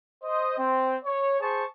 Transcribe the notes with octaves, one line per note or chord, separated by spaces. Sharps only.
C5 D#5
C4
C#5
G#4 C5 A5 C#6